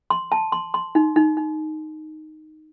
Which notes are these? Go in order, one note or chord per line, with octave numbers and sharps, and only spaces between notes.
C6
A5
C6
C6
D#4
D#4
D#4